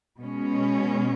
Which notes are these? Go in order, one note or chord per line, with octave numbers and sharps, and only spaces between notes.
B2 G#3 C#4